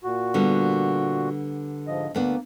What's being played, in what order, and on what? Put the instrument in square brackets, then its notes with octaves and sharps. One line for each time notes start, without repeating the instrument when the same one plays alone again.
[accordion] A#2 F#4
[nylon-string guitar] D3 G3 B3
[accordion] G#2 F3 D#5
[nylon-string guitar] D2 B3 D4 [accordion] A#3